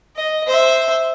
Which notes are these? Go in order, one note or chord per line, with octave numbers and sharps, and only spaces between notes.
D#5
C5 E5